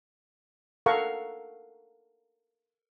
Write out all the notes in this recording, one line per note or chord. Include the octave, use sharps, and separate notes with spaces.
A4 A#4 F5 F#5 A#5 C#6